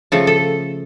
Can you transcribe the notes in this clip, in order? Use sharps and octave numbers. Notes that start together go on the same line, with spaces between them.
C#3 F3 A3 A4
A4